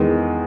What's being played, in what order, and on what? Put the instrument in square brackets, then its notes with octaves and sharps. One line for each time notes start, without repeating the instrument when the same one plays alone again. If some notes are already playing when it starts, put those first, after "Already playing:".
Already playing: [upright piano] E2 D#3 G#3